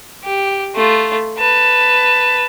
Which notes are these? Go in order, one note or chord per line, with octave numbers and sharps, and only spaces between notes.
G4
A3 F4
B4 A5